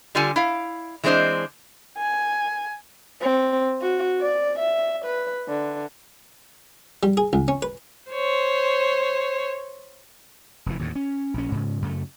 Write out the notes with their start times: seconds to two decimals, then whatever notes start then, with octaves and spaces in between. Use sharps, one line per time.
0.15 D3 G3 F4 A4 G#5
0.36 E4 F5
1.04 E3 G#3 C4 D4 C5 D#5
1.98 G#5
3.21 C4
3.82 F#4
4.21 D5
4.59 E5
5.05 B4
5.48 D3
7.03 G3
7.17 G#4
7.33 C#2
7.48 C#4
7.62 B4
8.11 C5 C#5
10.66 F1 F#2 E3
10.79 D#2 A2 D3
10.95 C#4
11.34 A#1 C#4
11.52 G#2 C#3
11.82 F#2 C#3 A3